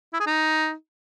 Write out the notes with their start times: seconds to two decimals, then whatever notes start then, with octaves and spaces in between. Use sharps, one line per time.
0.13 E4
0.20 G#4
0.27 D#4